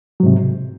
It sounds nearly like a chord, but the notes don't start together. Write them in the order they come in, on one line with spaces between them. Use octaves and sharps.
F#3 G#2 C3